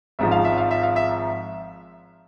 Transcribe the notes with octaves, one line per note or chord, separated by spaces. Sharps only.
G#1 G#2 F3 E5
F5
E5
F5
E5
F5
E5